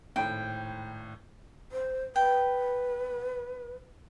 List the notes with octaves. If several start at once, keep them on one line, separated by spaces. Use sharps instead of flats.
G#1 A2 G5
C5
B4 G5